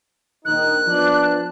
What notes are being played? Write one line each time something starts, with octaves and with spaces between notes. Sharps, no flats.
A#1 D#3 D#4 F#6
F3 B3 D4